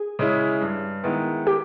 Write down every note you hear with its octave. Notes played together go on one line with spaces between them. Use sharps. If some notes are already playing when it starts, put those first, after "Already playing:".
Already playing: G#4
C#3 G#3 C#4 E4
G2
D#3 G#3 B3 E4
G4